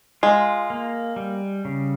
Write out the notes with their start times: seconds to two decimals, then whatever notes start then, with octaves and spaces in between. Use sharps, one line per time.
0.23 G#3 F4
0.70 A#3
1.16 G3
1.65 C#3